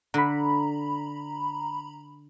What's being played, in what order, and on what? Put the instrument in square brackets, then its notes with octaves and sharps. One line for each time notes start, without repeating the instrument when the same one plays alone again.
[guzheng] D3 [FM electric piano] A#5 B5